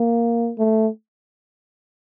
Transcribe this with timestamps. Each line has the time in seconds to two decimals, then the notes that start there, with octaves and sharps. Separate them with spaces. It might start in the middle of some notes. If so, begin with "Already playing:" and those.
Already playing: A#3
0.58 A3